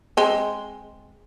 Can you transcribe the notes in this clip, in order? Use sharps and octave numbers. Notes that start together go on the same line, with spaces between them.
G#3 C4